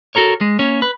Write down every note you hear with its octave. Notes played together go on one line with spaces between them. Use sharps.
F#4 A4 A#4 C#5
G#3
A#3 C#4 C#5
B4